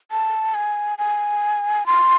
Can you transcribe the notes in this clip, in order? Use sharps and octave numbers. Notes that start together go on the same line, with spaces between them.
A5
G#5
G#5
C6